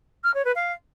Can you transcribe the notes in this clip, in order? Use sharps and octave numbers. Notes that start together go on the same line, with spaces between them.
F6
C#5
B4
F5